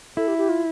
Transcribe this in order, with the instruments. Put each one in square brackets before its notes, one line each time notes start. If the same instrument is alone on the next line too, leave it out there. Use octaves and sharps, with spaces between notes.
[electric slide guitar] E4 [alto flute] A4
[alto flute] G4
G4
F4